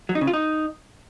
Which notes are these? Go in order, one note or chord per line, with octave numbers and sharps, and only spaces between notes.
F#3
D#4
C#3
F4
D#4